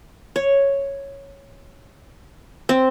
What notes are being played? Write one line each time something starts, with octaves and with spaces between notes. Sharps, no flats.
C#5
C4